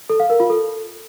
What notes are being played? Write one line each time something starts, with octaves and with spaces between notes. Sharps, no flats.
A4
F5
A#4
F4
A4